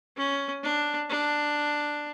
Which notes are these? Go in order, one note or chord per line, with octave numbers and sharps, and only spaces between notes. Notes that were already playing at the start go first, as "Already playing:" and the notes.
C#4
D4
D4